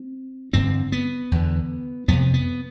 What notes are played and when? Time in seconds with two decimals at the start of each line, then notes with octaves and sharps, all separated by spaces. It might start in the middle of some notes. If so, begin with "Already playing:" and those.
Already playing: C4
0.53 G2 D3 C4
0.92 B3
1.31 E2 D3
2.08 F2 C3 B3
2.34 B3